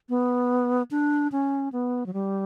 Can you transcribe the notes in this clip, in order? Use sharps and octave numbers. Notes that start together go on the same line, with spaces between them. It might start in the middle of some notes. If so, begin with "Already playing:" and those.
B3
D4
C#4
B3
F#3
G3